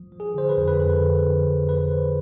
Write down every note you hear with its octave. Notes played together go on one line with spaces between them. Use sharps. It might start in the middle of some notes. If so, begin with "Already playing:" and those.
Already playing: F3
F3
G#4
D3 C5
B4
F2
B4
F2 A4
D3
F2
F2
F3 B4
F2 C5